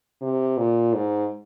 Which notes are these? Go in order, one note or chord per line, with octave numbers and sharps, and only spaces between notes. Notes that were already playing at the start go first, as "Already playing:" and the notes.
C3
A#2
G#2